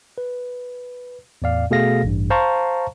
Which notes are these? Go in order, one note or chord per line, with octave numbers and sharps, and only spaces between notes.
B4
E2 A2 D5 F5
B2 A3 G#4 A4 F5 A#6
A1 G2
C5 F5 A5 A#5 C#6